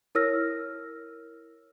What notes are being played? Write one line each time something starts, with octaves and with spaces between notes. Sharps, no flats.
E4 A#4 C#5 E6 F6 A#6